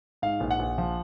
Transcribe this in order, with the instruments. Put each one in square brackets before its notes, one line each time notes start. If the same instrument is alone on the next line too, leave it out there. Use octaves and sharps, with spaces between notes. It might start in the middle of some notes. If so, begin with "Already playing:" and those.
[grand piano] G#2 F5
A#1
F#5
A#1
F3